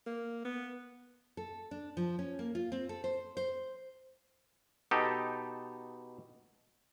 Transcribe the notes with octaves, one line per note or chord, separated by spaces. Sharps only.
A#3
B3
A4
D4
F3
C#4
A#3
F4
C4
A4
C5
C5
B2 D#4 G4 A4